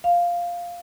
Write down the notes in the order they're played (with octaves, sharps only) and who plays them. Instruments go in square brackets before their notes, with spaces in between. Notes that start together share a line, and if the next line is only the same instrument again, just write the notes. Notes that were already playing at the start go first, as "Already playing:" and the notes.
[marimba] F5